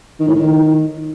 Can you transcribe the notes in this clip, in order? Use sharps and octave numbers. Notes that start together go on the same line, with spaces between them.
D#3
A2
D#3